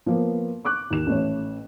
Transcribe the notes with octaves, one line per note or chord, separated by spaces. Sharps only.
F3 A#3 B3
C#6 D6 F#6
D#2 E7
A1 A3 C#5